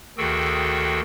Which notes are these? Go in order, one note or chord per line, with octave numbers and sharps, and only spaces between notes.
D2 D#3 F#4 G#4 A4 G5